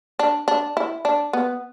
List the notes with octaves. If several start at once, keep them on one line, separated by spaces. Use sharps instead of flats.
D4
D4
E4
D4
B3